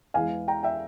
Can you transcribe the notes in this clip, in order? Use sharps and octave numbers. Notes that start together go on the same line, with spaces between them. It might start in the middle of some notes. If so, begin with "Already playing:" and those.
E2 E3 G#3 F5 G#5
G5 A#5
E5 G5